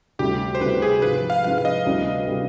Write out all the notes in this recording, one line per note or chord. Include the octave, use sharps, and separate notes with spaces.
D2 C3 G3 G4
C5
D2 C3 G3 B4
G#4
G#2 F3 G#3 B4
F5
G#2 F3 G#3 F5
F5
D#5
D2 C3 G3 D4
C3 G3 D4